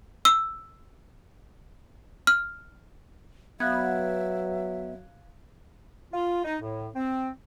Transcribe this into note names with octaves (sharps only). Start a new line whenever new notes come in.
E6
F6
F#3 B3 E5 F5 F#6 G#6
F4
D#4
A2
C4